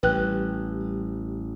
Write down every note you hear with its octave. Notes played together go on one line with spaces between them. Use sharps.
A1 G3 G4 B4 G5 F#6